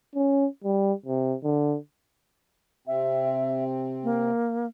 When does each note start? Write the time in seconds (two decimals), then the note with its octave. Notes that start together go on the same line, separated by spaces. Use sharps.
0.15 C#4
0.64 G3
1.06 C3
1.44 D3
2.87 C3 C4 E5
4.03 A#3